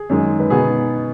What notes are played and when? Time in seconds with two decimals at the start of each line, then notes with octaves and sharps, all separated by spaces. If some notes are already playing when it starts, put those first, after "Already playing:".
Already playing: G#4
0.10 F#2 D#3 G#3 D#4
0.40 B4
0.50 B2 B3 D#4 G#4